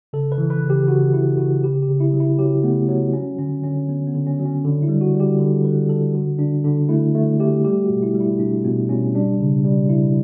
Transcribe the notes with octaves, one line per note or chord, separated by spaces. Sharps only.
C#3 A4
B4
E3
B4
C#3
G4
C#3 F#4
C#3 E4
C#3 F#4
C#3 G4
G4
C#3
E4
F#3
E4
F#3 G4
A3 B3
F#3 B3
F#3 C#4
D3 C#4
D3 C#4
D3 B3
B3
D3
C#4
F#3
C#4
D3
E4
G3
F#4
G3
G4
D3 A4
D3 B4
G3 A4
D3 F#4
D3 D4
D3 D4
A3 E4
A3
A3 G4
G3 G4
F#4
B2
E4
G3
E4
B2 D4
B2 B3
B2 C#4
G3 D4
C#3
G3
C#3 E4